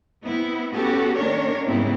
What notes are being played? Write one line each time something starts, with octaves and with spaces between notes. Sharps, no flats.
B3 C4 E4
B3 C#4 F#4 G4 A4
D#3 A#3 C#4 D4 A#4 C#5
G#2 C#3 G3 B3 C4 E4